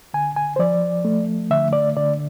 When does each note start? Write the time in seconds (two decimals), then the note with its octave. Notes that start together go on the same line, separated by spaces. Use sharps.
0.14 D3 G#5
0.36 G#5
0.56 C5
0.59 F3 D5
1.05 A3
1.50 D3 E5
1.73 D5
1.97 D3 D5